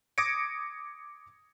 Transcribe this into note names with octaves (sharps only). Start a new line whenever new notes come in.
D6 D#6 G#6 A#6 C#7 D7